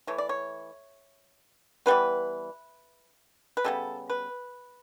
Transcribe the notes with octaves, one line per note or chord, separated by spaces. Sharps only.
E3 A3 C#5
D5
C#5
E3 G3 B3 B4
B4
C#3 G3 B3 A4
B4